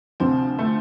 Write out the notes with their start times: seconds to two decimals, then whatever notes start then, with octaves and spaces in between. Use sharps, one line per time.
0.20 D2 C3 F3 C4
0.59 A3